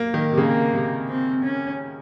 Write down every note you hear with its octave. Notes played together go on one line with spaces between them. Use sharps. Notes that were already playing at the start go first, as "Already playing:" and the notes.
Already playing: A#3
D#3
C3
C#3 A#3
C3
C4
C#4